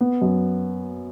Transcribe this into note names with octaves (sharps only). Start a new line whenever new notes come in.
B3
F#2